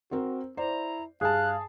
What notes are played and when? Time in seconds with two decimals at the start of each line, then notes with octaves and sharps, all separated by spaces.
0.11 C4 F#4 A#4 C5
0.57 E4 C5 D5 A#5
1.21 G2 G#4 F5 A5 F#6